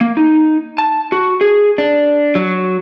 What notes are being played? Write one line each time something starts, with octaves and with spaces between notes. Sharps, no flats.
A#3
D#4
A5
F#4
G#4
D4
F#3